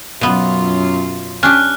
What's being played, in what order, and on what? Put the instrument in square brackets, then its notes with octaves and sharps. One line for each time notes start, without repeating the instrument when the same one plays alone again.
[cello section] F#2 F4 [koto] B2 B3
[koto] C#4 D4 G4 [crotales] F6 F#6